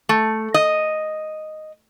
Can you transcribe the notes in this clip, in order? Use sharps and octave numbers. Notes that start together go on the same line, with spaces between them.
A3
D#5